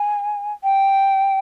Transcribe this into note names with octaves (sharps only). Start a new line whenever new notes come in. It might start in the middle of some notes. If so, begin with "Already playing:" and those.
Already playing: G#5
G5